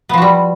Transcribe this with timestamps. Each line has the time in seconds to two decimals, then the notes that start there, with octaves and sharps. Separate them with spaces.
0.09 B3
0.14 F3
0.18 F#4
0.22 G3